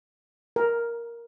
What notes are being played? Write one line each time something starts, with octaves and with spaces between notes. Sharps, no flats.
A#4